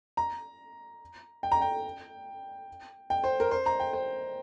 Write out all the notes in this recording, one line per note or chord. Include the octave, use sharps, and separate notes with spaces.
A#5
G5
A#5
G5
G5
C5
A#4
C5
A#5
G5
C5